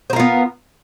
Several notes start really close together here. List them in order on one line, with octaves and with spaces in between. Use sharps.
C5 A#4 F4 B3